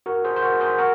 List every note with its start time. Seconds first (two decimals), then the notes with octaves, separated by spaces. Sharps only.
0.06 F#4 A#4
0.24 G#4 C5
0.36 C5
0.42 F#4 A#4
0.60 G#4 C5
0.78 F#4 A#4